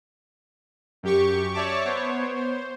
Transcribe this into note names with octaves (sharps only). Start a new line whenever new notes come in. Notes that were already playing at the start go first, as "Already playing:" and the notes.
F#2 G4 C#6
C#5 D5 E5 A5 C#6 D6
B3 C5 C#5
C5